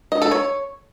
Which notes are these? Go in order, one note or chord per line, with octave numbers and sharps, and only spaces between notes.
D#5
A4
C#5